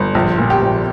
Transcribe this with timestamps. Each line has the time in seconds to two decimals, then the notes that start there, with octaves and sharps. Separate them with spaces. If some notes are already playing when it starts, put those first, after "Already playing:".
Already playing: G1
0.15 A#1
0.38 A#2
0.50 G4
0.62 A#1